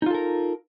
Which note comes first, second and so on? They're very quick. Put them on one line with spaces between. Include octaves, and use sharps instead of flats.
D#4 F4 A4 A#4